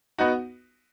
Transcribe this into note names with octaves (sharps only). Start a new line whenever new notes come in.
B3 D#4 F#4